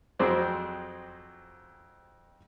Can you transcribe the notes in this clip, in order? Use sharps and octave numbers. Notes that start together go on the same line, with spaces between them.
F2 F#3 C4 G#4 C5 D5